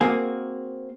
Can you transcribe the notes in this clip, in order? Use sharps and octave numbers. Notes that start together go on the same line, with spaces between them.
A#3 C4 F#4 G#4